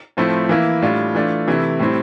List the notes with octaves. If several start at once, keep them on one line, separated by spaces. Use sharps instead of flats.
A2 F3 A3 C4 E4
E3 A#3 E4
A2 G3 D4 F4
E3 A3 D4 F4
C3 E3 A3 E4
A2 G3 C4 E4